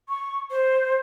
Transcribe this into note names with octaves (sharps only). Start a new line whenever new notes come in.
C#6
C5